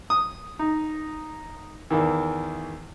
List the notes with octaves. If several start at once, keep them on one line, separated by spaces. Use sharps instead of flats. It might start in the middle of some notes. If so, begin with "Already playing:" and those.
D#6
D#4
E2 D#3 E3